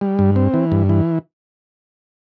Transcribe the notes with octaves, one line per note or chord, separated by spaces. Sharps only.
G3
G2
C4
E3
G2
E3